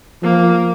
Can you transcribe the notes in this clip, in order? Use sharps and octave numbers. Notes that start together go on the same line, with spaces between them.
F3 A#3